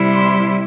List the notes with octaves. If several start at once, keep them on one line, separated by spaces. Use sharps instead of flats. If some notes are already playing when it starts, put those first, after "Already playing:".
Already playing: C3 G3 E4
C6